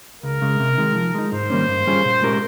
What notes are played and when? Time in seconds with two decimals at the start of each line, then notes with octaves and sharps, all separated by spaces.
0.23 C#2 A#4
0.42 C#3 G#3
0.60 C3
0.78 D#3 G#3
0.96 F3
1.15 G#3 D#4
1.32 G#2 C5
1.50 D#3 G3 A#3 C#4
1.68 G2
1.87 G3 C#4 F4 G#4
2.05 A#2
2.22 G#3 C#4 G4 A#4